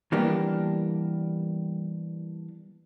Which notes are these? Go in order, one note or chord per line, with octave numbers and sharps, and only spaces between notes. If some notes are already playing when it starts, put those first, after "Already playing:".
E3 G3 A#3 B3 D4 G4